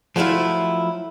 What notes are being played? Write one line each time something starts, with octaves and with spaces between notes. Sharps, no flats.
F3 F#3 A3 E4 F4